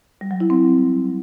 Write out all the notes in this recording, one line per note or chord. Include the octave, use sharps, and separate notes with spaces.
G3
F#3
E4
C4